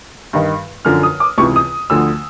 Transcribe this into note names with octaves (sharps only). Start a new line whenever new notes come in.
G2 D#3
F#2 D3 F3 F6
D#6
D6
C#2 C3 E3 C#6
D#6
D2 D3 F3 E6